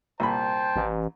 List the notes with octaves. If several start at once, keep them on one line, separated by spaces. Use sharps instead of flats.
C2 A#2 C5 G5 A5 B5
A1